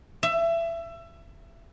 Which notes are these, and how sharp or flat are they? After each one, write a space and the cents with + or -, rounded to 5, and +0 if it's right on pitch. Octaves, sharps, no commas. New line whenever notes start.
E5 +25